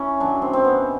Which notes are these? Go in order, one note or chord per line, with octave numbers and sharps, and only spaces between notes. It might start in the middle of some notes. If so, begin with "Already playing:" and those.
Already playing: C#4 E4
F#2 D#3 F#3 D4
C4
C4
B3